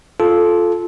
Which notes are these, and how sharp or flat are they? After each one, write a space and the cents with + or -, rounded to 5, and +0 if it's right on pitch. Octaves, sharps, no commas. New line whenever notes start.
F4 +0 A4 -15